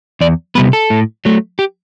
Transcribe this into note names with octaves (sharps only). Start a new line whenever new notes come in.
E2 D5
C3 G3 B3 B4
A4
A2
F#3 A3
G4